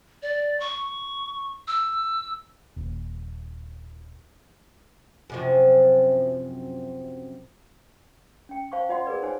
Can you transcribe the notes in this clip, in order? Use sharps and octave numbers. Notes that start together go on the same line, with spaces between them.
D5
C#6
E6
D#1
F#2 C3 F3
C#4 G5
C5 F5 A5 C#6 D6
F4 C5 D#5 E5 F#5 C6
G#4 A#4 B4 D5
D#4 C5 C#5 G#5